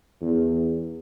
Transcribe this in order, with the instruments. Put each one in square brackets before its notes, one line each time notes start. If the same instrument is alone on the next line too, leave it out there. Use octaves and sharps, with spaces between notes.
[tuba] E2